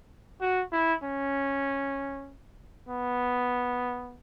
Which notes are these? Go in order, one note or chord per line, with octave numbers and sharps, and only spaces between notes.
F#4
E4
C#4
B3